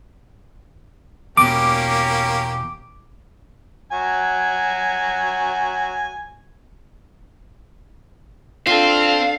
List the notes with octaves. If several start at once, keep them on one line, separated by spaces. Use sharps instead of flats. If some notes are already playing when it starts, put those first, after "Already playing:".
E2 B2 A#3 C#4 G4 D6
F#3 F#4 G#5
C4 D4 F4 A4 F5